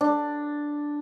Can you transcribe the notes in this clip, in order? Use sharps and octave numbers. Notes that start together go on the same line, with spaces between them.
D4